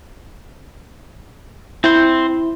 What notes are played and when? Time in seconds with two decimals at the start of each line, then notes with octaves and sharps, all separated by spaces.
1.84 C4 E4 C5